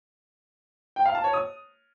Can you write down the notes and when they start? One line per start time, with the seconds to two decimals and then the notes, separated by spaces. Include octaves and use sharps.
0.96 G5
1.05 F5
1.15 A5
1.24 C#5
1.33 D#6